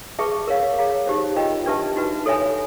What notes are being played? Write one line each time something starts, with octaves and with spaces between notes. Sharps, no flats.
G#4 B4 E5 A5 C#6
A#4 C#5 F5
G#4 C#5 F5 A#5
D#4 G4 C5
F4 A#4 D#5 G5 B5
D4 G4 B4 E5 A5
D#4 F#4 B4
A4 C#5 E5 G#5 B5